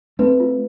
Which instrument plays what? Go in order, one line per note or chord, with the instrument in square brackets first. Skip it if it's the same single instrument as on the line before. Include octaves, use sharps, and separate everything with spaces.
[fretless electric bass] A3 C4 [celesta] B4
[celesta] F4